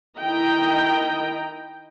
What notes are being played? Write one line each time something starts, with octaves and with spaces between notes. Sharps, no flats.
D#3 E4 D#5 G5 A#5